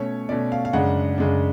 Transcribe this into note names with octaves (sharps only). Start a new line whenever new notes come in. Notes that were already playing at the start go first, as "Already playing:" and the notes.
Already playing: B2 A3 C#4 C#5
B2 A3 C#4 D5
F5
F5
F#2 C#3 G#3 D4 F#5
F#2 C#3 G#3 D4